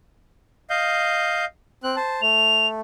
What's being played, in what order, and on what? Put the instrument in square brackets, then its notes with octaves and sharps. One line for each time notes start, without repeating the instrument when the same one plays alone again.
[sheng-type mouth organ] D#5 F5 G6
C4 F#6
C5 A5
[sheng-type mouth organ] A3 [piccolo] F7